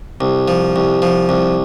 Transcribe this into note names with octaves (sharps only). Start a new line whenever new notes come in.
C2
F3
C2
F3
C2